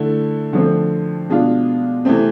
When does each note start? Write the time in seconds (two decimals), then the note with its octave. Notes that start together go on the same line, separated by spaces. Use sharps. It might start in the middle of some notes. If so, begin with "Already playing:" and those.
Already playing: D3 A3 E4
0.53 D3 F3 A3 C4
1.29 B2 G#3 D4 F4
2.05 C3 E3 A3 C4